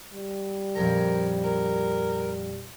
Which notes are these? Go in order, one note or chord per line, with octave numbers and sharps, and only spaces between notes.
G3
A#1 F2 A#4 A#5
A#4